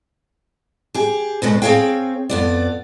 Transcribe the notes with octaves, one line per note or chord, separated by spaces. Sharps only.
G4 G#4
D2 B2 G#3 C#4
C4 G#4 A4 C#5 F5 G5
F2 B3 D5